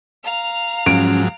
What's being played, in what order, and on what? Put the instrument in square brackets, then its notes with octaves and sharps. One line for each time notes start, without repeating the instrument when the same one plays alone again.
[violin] F5 A#5
[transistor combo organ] G#2 F3 F#3 [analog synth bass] C#4 [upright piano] D7